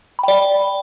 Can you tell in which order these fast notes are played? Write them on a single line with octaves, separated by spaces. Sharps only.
B5 G5 D5